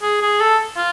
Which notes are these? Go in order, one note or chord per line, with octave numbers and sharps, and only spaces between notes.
G#4
G#4
A4
F4